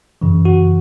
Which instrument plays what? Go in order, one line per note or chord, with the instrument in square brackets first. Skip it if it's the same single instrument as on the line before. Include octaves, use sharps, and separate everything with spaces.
[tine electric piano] F#2 C#3 E3
F#4